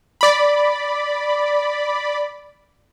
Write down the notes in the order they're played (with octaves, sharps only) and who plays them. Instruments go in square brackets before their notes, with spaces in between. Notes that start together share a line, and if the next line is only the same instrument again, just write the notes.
[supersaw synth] D5 B5